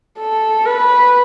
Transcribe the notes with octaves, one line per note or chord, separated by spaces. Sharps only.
A4
B4